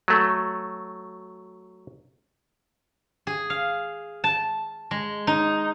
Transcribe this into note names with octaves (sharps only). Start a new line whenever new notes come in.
F#3 A3
G#4
F5
A5
G#3
D#4